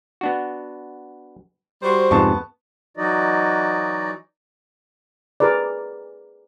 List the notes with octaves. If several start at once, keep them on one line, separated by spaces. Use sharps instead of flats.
B3 D4 F#4
G3 F#4 C5
F2 G#2 C3 B3 A5 C#6
E3 F#3 D#4 F#4 D5 D#5
G#4 A#4 B4 D5